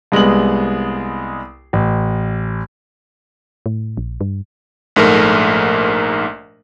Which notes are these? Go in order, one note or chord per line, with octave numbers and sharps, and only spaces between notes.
C2 G#3 B3 F#7
A1
A2
A#1
G2
A#1 G#2 A3 A#4